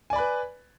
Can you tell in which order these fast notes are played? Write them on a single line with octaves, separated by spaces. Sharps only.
G#5 D5 B5 B4